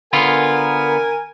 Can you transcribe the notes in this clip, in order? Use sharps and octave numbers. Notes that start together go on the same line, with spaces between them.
D3 B3 F4 A#4 G#5